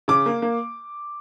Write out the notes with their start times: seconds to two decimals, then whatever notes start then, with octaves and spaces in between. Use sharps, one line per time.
0.08 C#3 D6
0.26 A#3
0.42 A#3